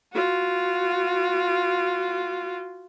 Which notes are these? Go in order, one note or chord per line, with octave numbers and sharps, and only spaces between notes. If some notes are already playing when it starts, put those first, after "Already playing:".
F4 F#4